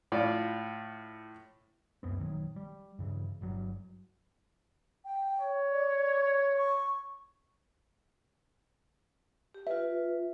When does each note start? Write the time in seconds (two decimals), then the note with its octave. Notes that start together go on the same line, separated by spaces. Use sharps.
0.12 A2 F4 D5
2.03 C#2 F#2 B3 C4
2.18 A#1 D#3 E3 F#3
2.56 G3
2.99 G2 C#3 E3
3.41 G1 G2 F#3
5.05 G5
5.40 C#5
5.71 D5
6.56 C#6
9.54 G4
9.67 F4 B4 E5